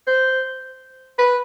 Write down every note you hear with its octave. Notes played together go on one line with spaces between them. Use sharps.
C5
B4